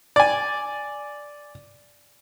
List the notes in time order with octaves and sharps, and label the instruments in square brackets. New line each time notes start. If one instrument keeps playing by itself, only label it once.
[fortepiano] D5 G#5